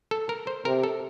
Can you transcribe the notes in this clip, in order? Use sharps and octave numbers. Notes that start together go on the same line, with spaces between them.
A4
A#4
C5
C3 A#4
A4